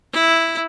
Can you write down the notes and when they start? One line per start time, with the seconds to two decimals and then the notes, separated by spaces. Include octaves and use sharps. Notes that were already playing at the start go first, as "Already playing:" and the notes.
0.13 E4